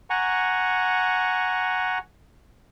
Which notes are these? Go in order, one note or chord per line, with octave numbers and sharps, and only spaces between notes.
F#5 G#5 A#5 C#6